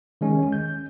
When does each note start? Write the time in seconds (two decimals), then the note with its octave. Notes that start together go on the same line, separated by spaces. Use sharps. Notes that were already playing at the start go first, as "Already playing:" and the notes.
0.21 D#3 G#3 C#4
0.52 G6